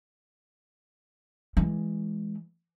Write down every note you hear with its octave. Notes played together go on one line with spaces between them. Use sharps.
E3 G#3